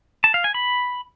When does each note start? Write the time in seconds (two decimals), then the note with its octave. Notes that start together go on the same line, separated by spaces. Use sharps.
0.24 A5
0.34 F5
0.44 G#5
0.54 B5